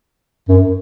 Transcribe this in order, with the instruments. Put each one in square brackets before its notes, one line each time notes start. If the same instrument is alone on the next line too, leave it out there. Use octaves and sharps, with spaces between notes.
[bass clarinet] F#2